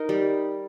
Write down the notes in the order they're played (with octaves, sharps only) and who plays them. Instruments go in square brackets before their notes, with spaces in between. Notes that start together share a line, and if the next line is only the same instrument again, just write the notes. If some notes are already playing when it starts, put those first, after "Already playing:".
Already playing: [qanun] D#4 A#4
G3